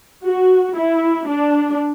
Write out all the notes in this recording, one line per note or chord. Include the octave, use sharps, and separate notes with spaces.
F#4
E4
D4